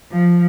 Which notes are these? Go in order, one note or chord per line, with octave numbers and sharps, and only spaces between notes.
F3